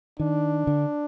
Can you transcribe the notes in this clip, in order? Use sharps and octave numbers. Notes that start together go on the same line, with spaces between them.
D#3 D4
D3